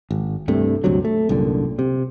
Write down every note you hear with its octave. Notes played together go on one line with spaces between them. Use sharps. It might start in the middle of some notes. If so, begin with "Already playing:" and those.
G#1
C2 G2 C3 A3
D2 G2 C3 F#3
A3
C2 F#2 A#2 D3
C3